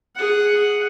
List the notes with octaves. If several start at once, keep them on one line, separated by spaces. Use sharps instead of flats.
G#4 F#5